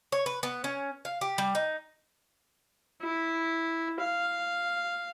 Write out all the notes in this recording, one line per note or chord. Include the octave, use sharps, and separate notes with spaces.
C#5
B4
B3
C#4
F5
G4
G3
D#4
E4
F5